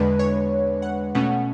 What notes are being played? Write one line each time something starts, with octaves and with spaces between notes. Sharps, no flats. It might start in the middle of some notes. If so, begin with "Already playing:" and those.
Already playing: E2 D3 G#3 D4 B4
C#5
F#5
B2 A3 C#4 F#5